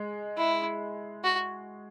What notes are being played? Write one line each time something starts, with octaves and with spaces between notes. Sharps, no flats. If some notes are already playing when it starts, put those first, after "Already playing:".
Already playing: G#3
E4
F#4